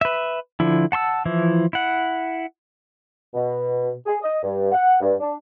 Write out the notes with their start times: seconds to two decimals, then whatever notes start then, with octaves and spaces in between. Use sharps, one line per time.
0.01 B4 E5
0.60 D3 F3 E4
0.92 F#5 A5 C6 E6
1.25 E3 F3 E4
1.73 E4 F#5
3.34 B2
4.06 G#4
4.22 D#5
4.43 G2
4.72 F#5
5.01 G2
5.20 D4